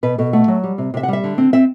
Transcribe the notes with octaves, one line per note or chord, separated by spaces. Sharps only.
B2 B4
B2 A4
A3 F#5
F#3
G3
C3
C3 E5
F#5
G3 E5
D3
C4
C4 E5